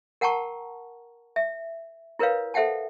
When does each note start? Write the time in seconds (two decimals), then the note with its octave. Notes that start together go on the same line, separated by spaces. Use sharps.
0.21 A#4 F#5 G5 A5 A#5 C#6
1.36 E5
2.19 E4 A#4 B4 C#5 F5
2.54 A4 C5 E5 F#5 G5 A5